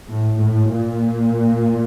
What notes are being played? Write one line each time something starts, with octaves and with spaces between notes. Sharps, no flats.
A2
A2
A#2